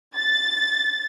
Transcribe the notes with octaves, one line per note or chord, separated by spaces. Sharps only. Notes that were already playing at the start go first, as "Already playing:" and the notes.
A6